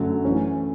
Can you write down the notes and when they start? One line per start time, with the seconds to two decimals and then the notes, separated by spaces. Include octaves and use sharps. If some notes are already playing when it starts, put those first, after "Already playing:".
Already playing: F#2 D3 F#3 A3
0.23 E3 A3 C#4